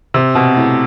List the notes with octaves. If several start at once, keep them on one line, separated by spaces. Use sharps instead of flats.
C3
B2
A2